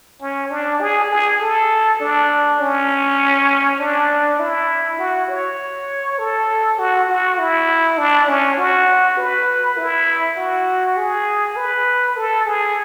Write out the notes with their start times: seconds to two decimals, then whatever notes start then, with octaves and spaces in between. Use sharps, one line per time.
0.21 C#4
0.51 D4
0.81 G#4
1.10 G#4
1.40 A4
2.00 D4
2.60 C#4
3.79 D4
4.39 E4
4.99 F#4
5.29 C#5
6.18 A4
6.79 F#4
7.09 F#4
7.38 E4
7.98 D4
8.28 C#4
8.58 F#4
9.17 B4
9.77 E4
10.37 F#4
10.97 G#4
11.56 B4
12.17 A4
12.46 G#4